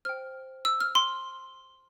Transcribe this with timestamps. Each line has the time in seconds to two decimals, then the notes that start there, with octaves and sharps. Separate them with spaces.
0.05 C5 G5 F6
0.65 E6
0.81 F6
0.95 C6